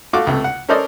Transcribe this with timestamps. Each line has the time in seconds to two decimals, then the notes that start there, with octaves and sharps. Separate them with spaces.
0.13 A3 F4 F#4 D6
0.27 C#2 C3 A3
0.44 F#5
0.68 C#4 A4 A#4 C5 D5 D#5